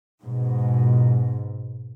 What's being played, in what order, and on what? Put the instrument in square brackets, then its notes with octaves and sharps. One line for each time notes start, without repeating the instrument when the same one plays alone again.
[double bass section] G#2 B2